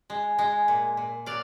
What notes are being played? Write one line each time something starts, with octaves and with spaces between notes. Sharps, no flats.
G#3
G#3
A#2
A#2
F#3 D5 F5